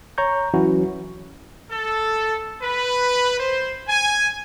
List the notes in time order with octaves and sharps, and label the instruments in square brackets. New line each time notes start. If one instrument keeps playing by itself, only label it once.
[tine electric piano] C#5 A#5 C#6 G6
E3 F#3 C#4 E4 F#4
[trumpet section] A4
B4
C5
G#5